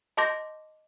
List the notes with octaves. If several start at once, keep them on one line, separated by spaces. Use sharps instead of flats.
D#5 A5 C6 D6 G6 A#6